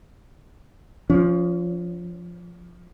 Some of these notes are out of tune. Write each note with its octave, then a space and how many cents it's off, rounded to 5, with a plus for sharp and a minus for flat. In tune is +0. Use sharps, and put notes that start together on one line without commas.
F3 +0 C#4 +35